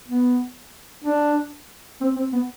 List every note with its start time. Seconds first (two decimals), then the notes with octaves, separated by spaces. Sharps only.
0.08 B3
1.04 D4
2.01 C4
2.16 C4
2.33 B3